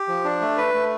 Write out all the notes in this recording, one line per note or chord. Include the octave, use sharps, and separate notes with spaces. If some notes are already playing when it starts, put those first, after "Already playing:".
Already playing: G4
F3
D4
A3
B4
A3